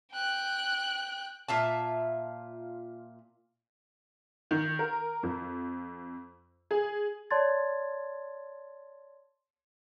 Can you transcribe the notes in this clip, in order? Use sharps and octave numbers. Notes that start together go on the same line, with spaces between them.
G5 F#6
A#2 F4 E5 A5
D#3
A#4
F2
G#4
C#5 D5 A5 C6 G#6 A6